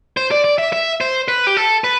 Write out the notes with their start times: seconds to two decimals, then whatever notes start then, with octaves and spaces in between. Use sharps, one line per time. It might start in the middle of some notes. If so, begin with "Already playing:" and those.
0.17 C5
0.31 D5
0.44 D5
0.58 E5
0.73 E5
1.01 C5
1.28 B4
1.47 G4
1.57 A4
1.84 B4